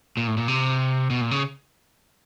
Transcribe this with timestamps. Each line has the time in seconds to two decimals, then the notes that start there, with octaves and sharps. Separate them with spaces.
0.17 A#2
0.28 A2
0.37 A#2
0.48 C3
1.10 B2
1.21 A#2
1.31 C#3